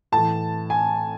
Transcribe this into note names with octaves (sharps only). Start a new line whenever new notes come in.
A2 E3 A5
G#5